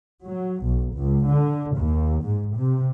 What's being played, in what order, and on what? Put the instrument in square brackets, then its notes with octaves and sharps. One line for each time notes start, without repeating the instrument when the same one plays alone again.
[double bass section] F#3
B1
C#2
D3
D#2
G#2
C3